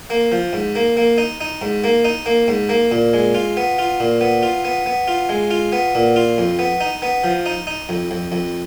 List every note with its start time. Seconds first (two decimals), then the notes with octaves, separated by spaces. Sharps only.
0.10 A#3
0.32 F3
0.53 G#2
0.75 A#3
0.97 A#3
1.18 D#4
1.41 D#4
1.62 G#2
1.84 A#3
2.05 D#4
2.26 A#3
2.48 G#2
2.69 A#3
2.91 A#2
3.13 G#3
3.35 F4
3.57 B3
3.78 F4
4.00 A#2
4.21 B3
4.43 F4
4.65 B3
4.86 B3
5.08 F4
5.29 G#3
5.51 F4
5.72 B3
5.95 A#2
6.16 F4
6.38 F2
6.59 B3
6.81 D#4
7.02 B3
7.24 F3
7.46 D#4
7.67 D#4
7.89 F2
8.11 F2
8.32 F2